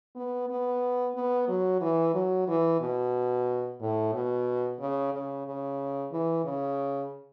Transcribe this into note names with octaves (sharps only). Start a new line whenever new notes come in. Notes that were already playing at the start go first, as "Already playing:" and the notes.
B3
B3
B3
F#3
E3
F#3
E3
B2
A2
B2
C#3
C#3
C#3
E3
C#3